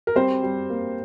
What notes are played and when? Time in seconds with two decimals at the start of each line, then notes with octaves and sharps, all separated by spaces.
0.07 A#4
0.15 G3 C4 C5
0.43 G3
0.70 A#3